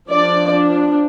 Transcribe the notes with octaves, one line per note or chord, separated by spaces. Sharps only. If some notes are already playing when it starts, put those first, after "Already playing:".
F3 D4 D5
D4